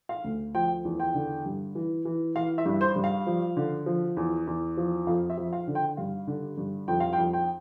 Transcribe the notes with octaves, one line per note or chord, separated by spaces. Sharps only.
F5
D2
F3 G5
E2
G5
D3
G2
E3
E3
E3 F5
E5
G2
C5
G2
F5
F3
D3
F3
E2
E2
F3
F2 F5
E5
F3
F5
D3
G5
G2 F5
D3
G2
F2 G5
F5
G5
F2
G5